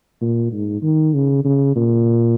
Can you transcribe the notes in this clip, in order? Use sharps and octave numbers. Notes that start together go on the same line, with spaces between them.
A#2
G#2
D#3
C#3
C#3
A#2